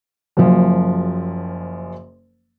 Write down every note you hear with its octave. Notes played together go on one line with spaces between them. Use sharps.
F#1 F#2 F3